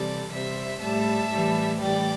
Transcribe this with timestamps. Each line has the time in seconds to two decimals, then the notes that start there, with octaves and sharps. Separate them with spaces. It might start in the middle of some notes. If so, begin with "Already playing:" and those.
Already playing: C3 E3 G3 A4 D5
0.31 C3 G3 C5 E5
0.81 A2 G3 E5 A5
1.30 A2 E3 G3
1.80 A2 E3 G3 D5 G5